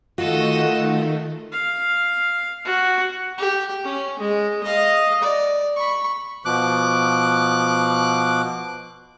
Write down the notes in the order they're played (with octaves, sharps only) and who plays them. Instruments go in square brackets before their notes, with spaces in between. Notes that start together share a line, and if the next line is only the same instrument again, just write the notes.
[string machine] D#3 A3 [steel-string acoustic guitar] F4 [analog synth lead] F#4 [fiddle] A4 D#5
[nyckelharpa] F5
F#4
G4
C#4
G#3
D#5 F5
D5
B5 C#6
[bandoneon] B2 F3 D6 F#6